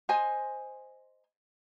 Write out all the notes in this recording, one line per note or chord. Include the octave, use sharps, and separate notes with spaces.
C5 D#5 G#5